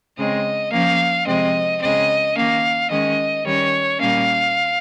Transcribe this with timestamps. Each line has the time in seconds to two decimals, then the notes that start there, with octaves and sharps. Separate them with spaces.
0.17 C#3 G#3 C4 D#5
0.71 F3 A#3 C#4 F5
1.26 C3 F3 G#3 C4 D#5
1.80 C#3 G#3 C4 D#5
2.35 D#3 A#3 C#4 F5
2.90 D#3 G#3 C#4 D#5
3.44 D#3 G3 C#4 C#5
3.99 A#2 G3 A#3 C#4 F5